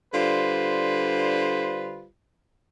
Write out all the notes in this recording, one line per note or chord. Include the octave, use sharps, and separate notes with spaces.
D3 G3 F4 B4 C5